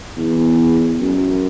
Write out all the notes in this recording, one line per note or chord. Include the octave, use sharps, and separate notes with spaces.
E2
F#2